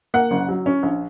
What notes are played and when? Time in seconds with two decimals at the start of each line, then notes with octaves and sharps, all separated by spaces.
0.14 A#3 F#5
0.31 F#1
0.49 F#3
0.66 C#4
0.83 A#1